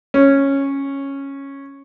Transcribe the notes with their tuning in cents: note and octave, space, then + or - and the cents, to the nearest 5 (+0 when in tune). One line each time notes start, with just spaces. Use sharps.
C#4 -10